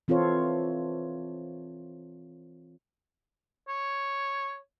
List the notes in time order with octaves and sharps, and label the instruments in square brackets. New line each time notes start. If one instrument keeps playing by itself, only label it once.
[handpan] E3 C4 F4 A4 C#5
[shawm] C#5